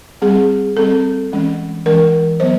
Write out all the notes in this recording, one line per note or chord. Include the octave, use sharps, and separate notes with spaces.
G3 C4 G#4
G3 C4 A4
E3 G#3 C#4
E3 G#3 C#4 A#4
F#3 B3 C5